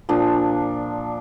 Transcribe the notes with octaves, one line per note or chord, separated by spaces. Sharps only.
A#2 F3 D4